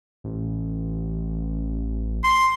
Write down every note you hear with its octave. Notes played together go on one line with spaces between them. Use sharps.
A1
C6